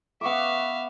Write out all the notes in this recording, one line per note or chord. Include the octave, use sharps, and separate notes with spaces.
B3 E5 F5 C#6 D6